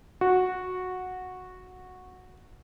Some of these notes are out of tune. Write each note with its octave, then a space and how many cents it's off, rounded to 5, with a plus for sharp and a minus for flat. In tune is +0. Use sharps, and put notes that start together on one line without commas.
F#4 -10